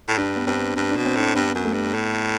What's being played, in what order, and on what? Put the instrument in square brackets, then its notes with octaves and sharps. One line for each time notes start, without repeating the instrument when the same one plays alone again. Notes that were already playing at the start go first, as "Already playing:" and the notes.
[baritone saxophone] A2
[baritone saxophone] G2 [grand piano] D4
[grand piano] B3
[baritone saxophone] G2 [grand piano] C4
[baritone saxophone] G2
[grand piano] D4
[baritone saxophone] B2
[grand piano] C4
[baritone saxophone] A2 [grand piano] D4
[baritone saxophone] G2 [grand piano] B3
[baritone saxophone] F#2
[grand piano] A3
[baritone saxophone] G2
A2